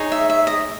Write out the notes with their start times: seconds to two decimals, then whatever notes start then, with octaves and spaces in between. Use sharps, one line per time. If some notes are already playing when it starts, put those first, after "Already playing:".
Already playing: D#4 G#4 C#5
0.12 E5
0.30 E5
0.47 D#5